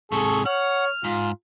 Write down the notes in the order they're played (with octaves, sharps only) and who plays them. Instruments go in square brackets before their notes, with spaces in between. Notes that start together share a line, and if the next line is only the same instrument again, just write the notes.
[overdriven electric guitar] G#2 C3 [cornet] G#4 [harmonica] A4 C#6
[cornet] C#5 [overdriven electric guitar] F#5 [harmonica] F6
[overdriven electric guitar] G#2 [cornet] F4